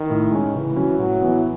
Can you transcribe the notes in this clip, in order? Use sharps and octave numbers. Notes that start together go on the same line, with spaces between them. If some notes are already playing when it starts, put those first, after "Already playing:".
Already playing: D#3
A2
G#3 C#4
C#3 E3
F#3 C#4
A2 F#3
E3 B3